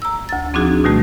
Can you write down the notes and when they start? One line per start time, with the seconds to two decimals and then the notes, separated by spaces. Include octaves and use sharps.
0.02 A#5 E6
0.29 D2 A6
0.54 F3 C4 D4 D#4 F#4 G#4
0.84 B2 D#3 G3 A3 F#4